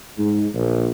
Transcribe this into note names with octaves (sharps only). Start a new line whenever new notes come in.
G#2
A#1